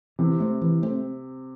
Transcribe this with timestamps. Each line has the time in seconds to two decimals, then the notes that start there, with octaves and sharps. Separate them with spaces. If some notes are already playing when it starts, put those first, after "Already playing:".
0.19 C3 E3
0.40 A3 C4
0.61 E3
0.82 A3 C4